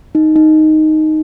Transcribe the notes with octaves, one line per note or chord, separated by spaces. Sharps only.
D#4
D#4